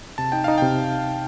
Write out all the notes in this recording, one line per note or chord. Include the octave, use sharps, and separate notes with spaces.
C3 A5
D#4 G5
D#4 F5
C3 G5